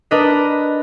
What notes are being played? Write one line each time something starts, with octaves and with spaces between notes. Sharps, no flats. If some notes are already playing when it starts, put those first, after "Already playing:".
D4 A#4 B4 D#5